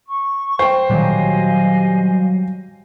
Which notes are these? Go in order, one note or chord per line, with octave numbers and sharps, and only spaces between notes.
C#6
C5 G5
A#2 D#3 E3 F#3 G3 D#5 F5 G#5